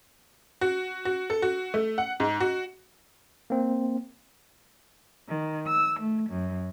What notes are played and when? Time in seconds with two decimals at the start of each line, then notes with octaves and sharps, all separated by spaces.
0.61 F#4
1.05 F#4
1.30 A4
1.42 F#4
1.74 A3
1.98 F#5
2.20 G#2
2.40 F#4
3.50 A#3 C4
5.29 D#3
5.67 E6
5.99 A3
6.29 F#2